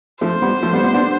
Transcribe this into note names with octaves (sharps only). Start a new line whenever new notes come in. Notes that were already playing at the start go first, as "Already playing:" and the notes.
F3 A3 C5
G3 B3
F3 A3
G3 B3
G3 B3
B3 D4